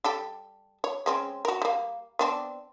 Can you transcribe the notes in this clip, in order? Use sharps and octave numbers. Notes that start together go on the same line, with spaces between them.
G3 G4 A4
C#5
G#3 C4 C#4
F#4 A#4
G3 A#3
B3 C4 D4